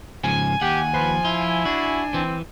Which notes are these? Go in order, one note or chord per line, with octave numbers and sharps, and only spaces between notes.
G#2 C#3 F3 G#5
D#2 G4 F#5
F3 B4 C5
E4 F4
D4 F#4
E3 C4